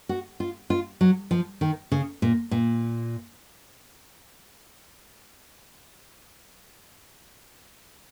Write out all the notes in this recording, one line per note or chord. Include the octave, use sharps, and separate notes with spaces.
F#4
F4
F4
F#3
F3
D#3
C#3
A#2
A#2